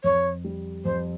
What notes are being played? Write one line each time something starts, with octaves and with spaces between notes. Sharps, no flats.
F2 C#5
G3
F2 C5